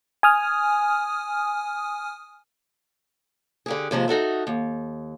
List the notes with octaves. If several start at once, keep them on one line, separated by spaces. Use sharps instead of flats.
G#5 D#6 F6
D3 G4 G#4
D#2 C3 F3 G#3
D#4 F#4 A4 E5
D#2